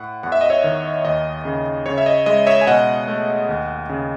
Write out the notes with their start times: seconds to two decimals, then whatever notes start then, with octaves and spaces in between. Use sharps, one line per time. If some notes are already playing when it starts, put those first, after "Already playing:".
Already playing: A2 F#5
0.23 E2 F#5
0.32 E5
0.41 D#5
0.50 C#5 E5
0.64 D#3
1.05 D#2 D#5
1.45 C#3
1.86 C#3 C#5
1.98 E5
2.06 D#5
2.26 G#3 D#5
2.47 C#5 E5
2.61 G#5
2.67 B2 D#5 F#5
3.08 A3
3.49 D#2
3.90 C#3